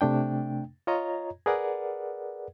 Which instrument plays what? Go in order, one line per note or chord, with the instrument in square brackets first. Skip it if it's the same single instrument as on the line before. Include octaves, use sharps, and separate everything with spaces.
[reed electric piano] C3 A3 D4 G5
F4 C#5 D#5 A#5
G#4 A#4 B4 D5 F#5